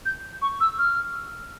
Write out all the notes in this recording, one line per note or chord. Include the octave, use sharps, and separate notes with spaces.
G6
C#6
E6
F6